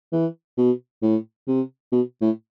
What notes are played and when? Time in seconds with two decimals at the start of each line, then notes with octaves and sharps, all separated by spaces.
0.12 E3
0.57 B2
1.02 A2
1.47 C3
1.92 B2
2.21 A2